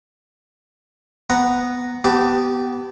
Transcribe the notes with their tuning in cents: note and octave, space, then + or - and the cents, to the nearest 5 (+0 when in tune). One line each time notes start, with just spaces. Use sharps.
B3 +0 F#5 +0 A#5 +0
B3 +0 G4 -20 A5 +15